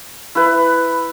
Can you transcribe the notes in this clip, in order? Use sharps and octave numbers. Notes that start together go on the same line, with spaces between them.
E4 B4